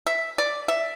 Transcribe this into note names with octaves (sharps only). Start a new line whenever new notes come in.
E5
D5
E5